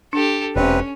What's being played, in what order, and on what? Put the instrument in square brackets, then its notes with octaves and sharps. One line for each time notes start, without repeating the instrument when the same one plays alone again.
[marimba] D4 [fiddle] G4 A4
[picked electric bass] E1 [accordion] C3 C4 B4 [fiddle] C#4